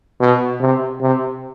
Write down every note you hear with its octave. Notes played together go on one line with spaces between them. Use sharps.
B2
C3
C3